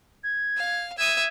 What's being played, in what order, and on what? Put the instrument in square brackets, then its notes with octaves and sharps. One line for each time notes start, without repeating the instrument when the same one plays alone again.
[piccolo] G#6
[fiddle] F5
[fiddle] E5 D#6 [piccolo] G#6